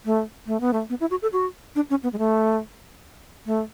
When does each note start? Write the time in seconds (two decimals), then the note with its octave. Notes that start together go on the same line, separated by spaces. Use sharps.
0.05 A3
0.47 A3
0.61 B3
0.73 A3
0.90 B3
1.01 E4
1.11 F#4
1.22 A4
1.33 F#4
1.75 D4
1.90 C#4
2.03 B3
2.13 G#3
2.18 A3
3.46 A3